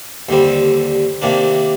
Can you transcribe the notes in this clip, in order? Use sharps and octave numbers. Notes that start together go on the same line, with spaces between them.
D#2 D3 G3 C4
C3 D#3 A#3 D4